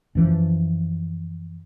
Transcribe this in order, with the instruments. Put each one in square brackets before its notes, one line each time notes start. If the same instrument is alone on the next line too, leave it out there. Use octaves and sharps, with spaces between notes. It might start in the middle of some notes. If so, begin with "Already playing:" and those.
[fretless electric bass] F#2 E3 F3